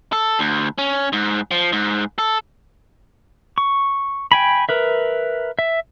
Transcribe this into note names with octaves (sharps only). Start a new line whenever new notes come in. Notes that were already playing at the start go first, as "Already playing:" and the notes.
A4
D2
C#4
G#2
F3
G#2
A4
C#6
G5 G#5 B5
A#4 B4 E5
E5